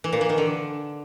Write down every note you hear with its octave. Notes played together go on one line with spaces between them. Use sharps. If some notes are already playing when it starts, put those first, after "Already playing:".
E3
A#2
E3
D#3
D3